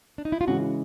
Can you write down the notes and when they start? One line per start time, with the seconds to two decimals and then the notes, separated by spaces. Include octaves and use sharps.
0.18 D4
0.25 D#4
0.32 E4
0.41 F4
0.47 C#3 E3 G#3 F#4